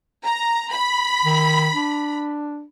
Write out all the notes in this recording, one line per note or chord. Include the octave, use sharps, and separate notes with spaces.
A#5
B5
D#3
D4